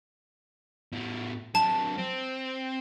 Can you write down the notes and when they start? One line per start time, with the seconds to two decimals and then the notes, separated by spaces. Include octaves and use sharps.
0.92 A2 B3
1.55 F#3 D4 A5
1.97 C4